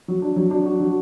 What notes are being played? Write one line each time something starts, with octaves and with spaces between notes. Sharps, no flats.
F#3
D4
F#3
D4
F#4
F#3